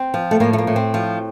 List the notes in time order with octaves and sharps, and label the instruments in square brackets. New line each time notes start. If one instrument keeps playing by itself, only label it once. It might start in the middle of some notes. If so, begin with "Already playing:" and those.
Already playing: [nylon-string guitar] C4
F3
A3
A2 A#3
A3
A#3
A2
C4
F3